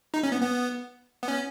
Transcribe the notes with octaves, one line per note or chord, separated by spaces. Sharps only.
D#4
C#4
B3
B3
B3
C#4